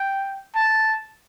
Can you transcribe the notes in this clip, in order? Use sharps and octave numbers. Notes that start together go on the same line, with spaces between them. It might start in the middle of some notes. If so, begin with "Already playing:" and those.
Already playing: G5
A5